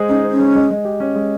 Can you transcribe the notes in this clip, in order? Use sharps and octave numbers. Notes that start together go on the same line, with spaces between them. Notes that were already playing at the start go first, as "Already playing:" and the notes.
Already playing: G#3 G#4 C5
C#4 D#4
C5
C#4
G#3
G#3
G#3
G4
C#4
G#3